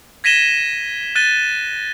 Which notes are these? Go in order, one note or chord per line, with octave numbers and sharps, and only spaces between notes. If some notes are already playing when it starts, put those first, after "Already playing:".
G#6 A#6 B6 D#7 E7 G7
F#6 A6 D#7 G7